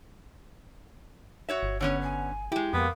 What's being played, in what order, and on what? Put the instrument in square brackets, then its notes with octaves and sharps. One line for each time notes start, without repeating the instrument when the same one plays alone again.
[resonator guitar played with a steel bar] F#4 C#5 E5
[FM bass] G1
[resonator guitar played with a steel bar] D3 B3 C#4 [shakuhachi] C#5
[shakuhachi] G#5
[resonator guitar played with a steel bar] G#3 G4 [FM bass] E4
[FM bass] F2 [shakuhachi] A#3 [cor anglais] B3